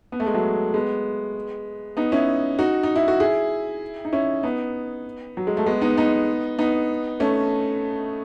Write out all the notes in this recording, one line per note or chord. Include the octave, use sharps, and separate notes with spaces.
B3
A3
G#3
F#3 A3
G#3 B3
B3 D#4
C#4 E4
D#4 F#4
D#4
E4
F#4
E4 G#4
D#4
C#4 E4
B3 D#4
F#3
G#3
A3
G#3 B3
B3 D#4
B3 D#4
B3 D#4
A3 C#4